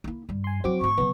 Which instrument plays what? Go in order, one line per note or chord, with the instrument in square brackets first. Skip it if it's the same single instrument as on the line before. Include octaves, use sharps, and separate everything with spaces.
[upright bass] A#3 E4
G2 G3
[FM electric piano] G#5 C6
[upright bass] F#3 E4 [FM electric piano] C4 F#4 D6
[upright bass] G#2 A3 [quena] C#6
[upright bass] C#3 F#3 [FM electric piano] B3